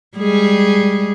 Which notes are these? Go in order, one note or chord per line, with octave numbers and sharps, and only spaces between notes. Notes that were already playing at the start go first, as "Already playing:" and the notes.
G3 G#3 G#4